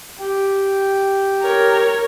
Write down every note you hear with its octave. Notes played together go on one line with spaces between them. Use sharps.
G4 G5
A#4 C#5